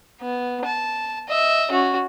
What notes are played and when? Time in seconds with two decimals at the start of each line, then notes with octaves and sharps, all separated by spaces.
0.21 B3
0.65 A5
1.29 D#5 E5
1.71 C#4 F#4